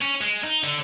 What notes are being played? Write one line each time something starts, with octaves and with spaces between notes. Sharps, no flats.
C#4
G#3
D#4
D3